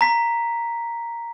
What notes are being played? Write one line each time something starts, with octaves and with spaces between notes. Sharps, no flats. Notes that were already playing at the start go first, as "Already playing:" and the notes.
A#5 B6